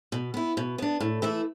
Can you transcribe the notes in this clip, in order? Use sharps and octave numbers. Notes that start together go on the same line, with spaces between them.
B2
B3 E4
B2
B3 D4
A2
E3 A3 E4